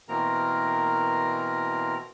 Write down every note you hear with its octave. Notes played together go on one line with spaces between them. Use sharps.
B2 E3 A#3 C4 A#4 A#5